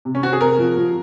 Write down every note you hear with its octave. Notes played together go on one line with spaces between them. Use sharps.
C3
C#4
C4 F#4
G#4
C3 A#4
F3
F3